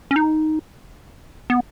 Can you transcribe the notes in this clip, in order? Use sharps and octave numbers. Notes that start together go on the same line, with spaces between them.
C#4
D#4
B3